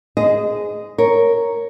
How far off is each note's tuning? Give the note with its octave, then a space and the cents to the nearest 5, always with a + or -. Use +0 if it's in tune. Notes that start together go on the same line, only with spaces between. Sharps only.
G#4 +0 C5 -30 D#5 +0
A#4 +0 C#5 +0